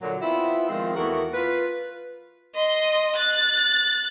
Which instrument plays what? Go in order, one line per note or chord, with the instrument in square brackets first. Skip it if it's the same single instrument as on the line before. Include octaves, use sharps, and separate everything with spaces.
[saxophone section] A#2 D3 F#3
B3 C4 E4 F4
D#3 F3 G#3 C4 F4
E2 A3 F#4 A#4
F4 B4
[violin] D#5 C6
F#6 A6